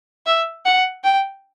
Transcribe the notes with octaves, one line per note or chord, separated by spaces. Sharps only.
E5
F#5
G5